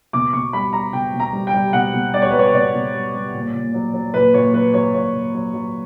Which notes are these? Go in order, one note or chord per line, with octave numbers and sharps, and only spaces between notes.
B2 D6
B2 C#6
G3 B5
G3 A#5
B2 G5
B2
A#5
G3
G5
G3
B2 F#5
B2
G3 D5
C#5
G3 B4
C#5
B2 D5
B2
G3
G3
A#2
A#2
F#3
F#3
A#2 B4
A#2 C#5
F#3 B4
F#3 C#5
A#2 C#5
A#2
F#3
F#3